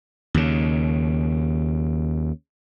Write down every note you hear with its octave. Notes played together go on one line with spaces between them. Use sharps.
D#2 C#3